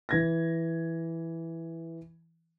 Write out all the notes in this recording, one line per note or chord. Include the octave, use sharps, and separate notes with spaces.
E3 G#6 A#6